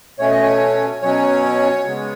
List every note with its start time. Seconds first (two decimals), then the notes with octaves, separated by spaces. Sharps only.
0.19 B2 A3 C#4 C#5
0.31 D#5
0.43 C#5
1.02 B2 F#3 C#4 C#5
1.85 C#3 G#3 B3